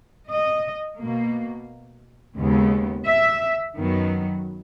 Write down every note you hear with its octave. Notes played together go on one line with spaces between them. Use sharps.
D#5
B2 A#3
D#2 C#3 G#3 B3
E5
F#2 D#3 F#3 B3